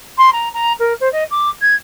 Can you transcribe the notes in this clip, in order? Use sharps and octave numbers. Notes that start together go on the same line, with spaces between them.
C6
A#5
A#5
A#4
C5
D#5
D6
G#6